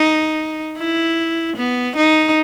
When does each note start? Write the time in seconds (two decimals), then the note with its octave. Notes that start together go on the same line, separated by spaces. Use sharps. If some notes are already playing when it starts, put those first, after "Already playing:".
Already playing: D#4
0.78 E4
1.57 B3
1.96 D#4